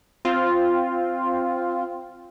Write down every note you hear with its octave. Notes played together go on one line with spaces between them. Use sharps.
C4 F4